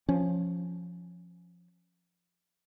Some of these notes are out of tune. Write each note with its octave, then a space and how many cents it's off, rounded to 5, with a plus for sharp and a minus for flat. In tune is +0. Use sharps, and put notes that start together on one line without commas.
F3 +5 C#4 +0